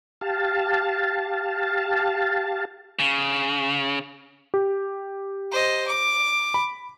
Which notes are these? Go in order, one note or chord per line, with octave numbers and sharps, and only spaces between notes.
G4 F5 A5
C#3
G4
C5 D#5
D6
B5